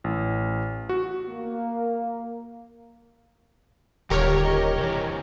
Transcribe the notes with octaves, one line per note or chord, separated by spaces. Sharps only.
A1
F#4
A#3
D#1 D3 G4 A#4 C#5
D#5
C3 E3